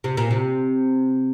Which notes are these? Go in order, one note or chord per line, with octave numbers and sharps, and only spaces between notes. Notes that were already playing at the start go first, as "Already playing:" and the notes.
C3
A#2
C3